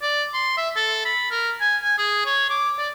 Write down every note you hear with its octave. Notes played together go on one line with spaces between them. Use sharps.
D5
C6
E5
A4
B5
A#4
G#5
G#5
G#4
C#5
D6
D5